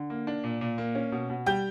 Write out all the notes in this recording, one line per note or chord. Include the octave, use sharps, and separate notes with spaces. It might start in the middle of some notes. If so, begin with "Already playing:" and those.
Already playing: D3
A#3
D4
A#2
A#2
A#3
C#4
B2
B2
G3 G5 G6